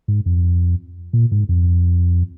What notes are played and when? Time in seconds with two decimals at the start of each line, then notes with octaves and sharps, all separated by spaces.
0.08 G#2
0.26 F2
1.13 A#2
1.32 G#2
1.49 F2